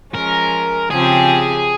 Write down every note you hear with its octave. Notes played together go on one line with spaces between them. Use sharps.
F3 G#3 C#4 A#4
C#3 F3 C4 G4 G#4